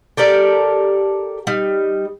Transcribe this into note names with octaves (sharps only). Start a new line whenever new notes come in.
G4 A4 A#4 D5
G3 D#4